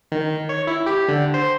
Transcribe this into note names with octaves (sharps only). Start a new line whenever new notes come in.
D#3
C#5
E4
G4
D3
C5